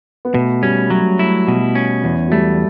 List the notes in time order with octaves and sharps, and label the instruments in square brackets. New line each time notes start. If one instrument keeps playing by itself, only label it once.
[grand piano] B3
[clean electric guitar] B2 [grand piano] A3
[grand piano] G3 [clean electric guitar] C#4
[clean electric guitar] F#3 [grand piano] A3
[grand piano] A3 [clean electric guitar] E4
[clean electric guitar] B2
C#4
E2
[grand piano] F#3
[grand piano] G3 [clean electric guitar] A3